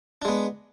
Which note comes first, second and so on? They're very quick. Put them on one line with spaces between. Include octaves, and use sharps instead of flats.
D4 G#3 B3